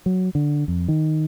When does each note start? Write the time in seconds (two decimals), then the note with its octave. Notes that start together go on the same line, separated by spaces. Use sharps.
0.06 F#3
0.35 D3
0.68 F2
0.88 D#3